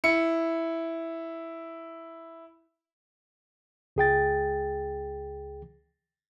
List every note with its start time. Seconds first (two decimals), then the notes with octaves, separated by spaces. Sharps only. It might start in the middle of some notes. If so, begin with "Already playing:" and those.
0.04 E4 C#7
3.96 C#2 G#4 G5 A6